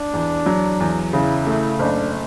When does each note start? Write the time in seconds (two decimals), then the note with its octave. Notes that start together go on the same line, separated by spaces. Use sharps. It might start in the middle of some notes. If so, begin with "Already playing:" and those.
Already playing: D4
0.13 E2
0.46 F#3
0.80 E2
1.13 C#3 E4
1.47 A3
1.79 F#1 D4